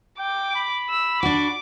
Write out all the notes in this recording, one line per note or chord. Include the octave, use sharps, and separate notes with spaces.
G5 D6
B5
E6
D4 F#4 D6